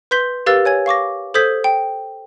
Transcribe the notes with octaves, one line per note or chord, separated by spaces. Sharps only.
B4 C6 G6 B6 G7
G4 A#4 B4 F5 E6 A6
C#5 G#5 G#6
F5 C#6 D6 A#6
A4 C5 D#6 G6 G#6 B6
G5